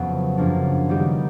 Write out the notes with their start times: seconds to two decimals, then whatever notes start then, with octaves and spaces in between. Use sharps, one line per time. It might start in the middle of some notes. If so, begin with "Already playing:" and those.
Already playing: F2 C#3 F#3 A3 B3
0.37 F#2 C#3 F3 A#3 D4
0.89 D#3 G3 B3 D#4 G4